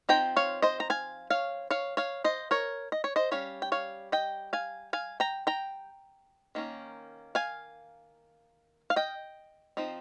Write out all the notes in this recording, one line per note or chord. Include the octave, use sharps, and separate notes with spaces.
F3 C4 D#4 G5 A#5
C#5 F5
C5 D#5
A#5
F5 G#5
C#5 F5
C#5 F5
C#5 F5
C5 D#5
A#4 C#5
D#5
C#5
C5 D#5
G3 C#4 C#5 F5
G5
C#5 F5
D#5 G5
F5 G#5
F5 G#5
G5 A#5
G5 A#5
D#3 A#3 C#4
F5 G#5
F5
D#5 G5
F3 C4 D#4